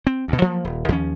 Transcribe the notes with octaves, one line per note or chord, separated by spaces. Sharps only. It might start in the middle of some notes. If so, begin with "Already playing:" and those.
C4
D2 B2
F3 F#3 A#3
D#1
D#2 F3 C#4